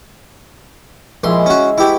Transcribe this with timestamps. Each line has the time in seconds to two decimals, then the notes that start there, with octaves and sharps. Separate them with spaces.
1.24 A#1 G#3 E4 G#4 C6
1.46 C#4 F#4
1.78 E4 F#4 G4 B4